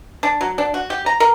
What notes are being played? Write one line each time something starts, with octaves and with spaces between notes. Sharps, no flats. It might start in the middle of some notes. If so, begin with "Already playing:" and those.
D4
F#3
D4
F#4
G4
A#5
A#4